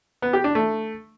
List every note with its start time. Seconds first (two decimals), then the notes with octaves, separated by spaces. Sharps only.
0.22 B3
0.33 G4
0.44 D4
0.55 A3